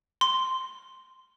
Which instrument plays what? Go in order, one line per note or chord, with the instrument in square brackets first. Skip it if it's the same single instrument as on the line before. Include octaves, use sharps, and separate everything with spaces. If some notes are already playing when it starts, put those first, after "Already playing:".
[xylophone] C6